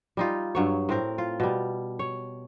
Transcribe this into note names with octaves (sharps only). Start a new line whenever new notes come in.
G3 D#4 F4
G2 F#3 C#5
A2 C4 A#4
F4
B2 G3
C#5